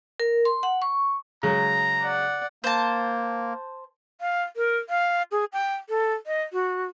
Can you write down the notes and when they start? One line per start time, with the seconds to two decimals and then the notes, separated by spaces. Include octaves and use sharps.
0.20 A#4
0.45 C6
0.63 F#5
0.82 C#6
1.43 C#3 F#3 G#3 A#5
2.02 D5 F#5
2.64 A#3 C5 A5
4.21 F5
4.56 A#4
4.89 F5
5.32 G#4
5.53 G5
5.89 A4
6.27 D#5
6.53 F#4